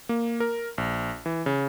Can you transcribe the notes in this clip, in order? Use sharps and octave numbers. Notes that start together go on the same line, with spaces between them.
A#3
A#4
A#1
E3
C#3